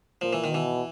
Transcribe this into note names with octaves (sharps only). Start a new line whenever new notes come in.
A#2 F3
E3
D#3
B2 E3